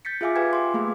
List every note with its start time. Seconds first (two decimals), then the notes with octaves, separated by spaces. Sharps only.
0.05 G6 A6 B6 C#7
0.21 F4 G#4 E5 F5 G#5 D6
0.36 F4 G4 B4 G5 G#5 G#6
0.53 C6 D6
0.74 A3 A#3 G#4 F5